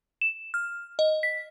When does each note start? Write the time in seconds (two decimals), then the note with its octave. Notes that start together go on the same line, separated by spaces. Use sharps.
0.22 E7
0.54 F6
0.99 D#5
1.23 B6